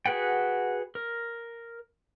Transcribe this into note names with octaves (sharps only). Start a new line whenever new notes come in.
F#4 G#4 B4 F#5 G5
A#4